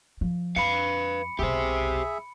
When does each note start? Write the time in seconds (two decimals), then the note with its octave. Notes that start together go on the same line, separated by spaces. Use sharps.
0.21 F3
0.56 F2 B4 F5 B5 C#7
1.39 E1 B1 G4 G#4 C5 E5